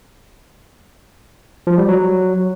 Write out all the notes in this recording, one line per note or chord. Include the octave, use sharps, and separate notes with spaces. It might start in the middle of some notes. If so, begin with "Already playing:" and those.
F3
G3
F#3